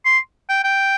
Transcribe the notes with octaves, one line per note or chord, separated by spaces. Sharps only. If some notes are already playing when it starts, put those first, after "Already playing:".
C6
G5
G5